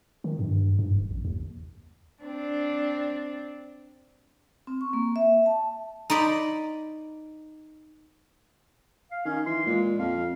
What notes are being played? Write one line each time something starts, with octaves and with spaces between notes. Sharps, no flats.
D#3
G2
G2
D1
A1
D#2
C4 D4
C4
C#6
A#3
E5
A5
D#4 C5 D5 B5
F5
D#3 C#4
E3 C6
A#2 G#3
F2 F5